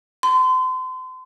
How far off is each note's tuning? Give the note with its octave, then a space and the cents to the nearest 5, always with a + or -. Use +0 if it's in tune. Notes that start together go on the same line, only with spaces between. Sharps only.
C6 -35